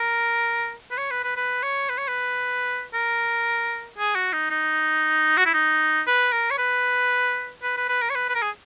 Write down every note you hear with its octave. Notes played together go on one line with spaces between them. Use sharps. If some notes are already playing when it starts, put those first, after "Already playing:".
Already playing: A#4
B4
C#5
B4
B4
B4
C#5
B4
C#5
B4
A#4
G#4
F#4
D#4
D#4
F#4
E4
D#4
B4
A#4
C#5
B4
B4
B4
B4
A#4
C#5
B4
B4
A#4
G#4